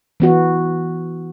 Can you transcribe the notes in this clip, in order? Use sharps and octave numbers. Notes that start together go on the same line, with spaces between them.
E3 B3 F#4